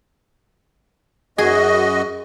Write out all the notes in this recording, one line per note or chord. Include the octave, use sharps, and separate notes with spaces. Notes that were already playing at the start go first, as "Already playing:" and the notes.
F#2 F#4 G#4 D#5